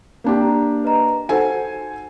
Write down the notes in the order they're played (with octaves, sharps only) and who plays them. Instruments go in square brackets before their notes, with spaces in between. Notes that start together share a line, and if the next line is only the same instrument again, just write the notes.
[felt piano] A#3 D4 G4
[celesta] A#5
B4 D#5 A#5
[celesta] D#4 F#4 F#5 [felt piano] A4 C5 G#5